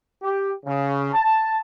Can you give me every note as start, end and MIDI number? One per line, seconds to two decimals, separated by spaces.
0.22 0.52 67
0.65 1.11 49
1.13 1.58 81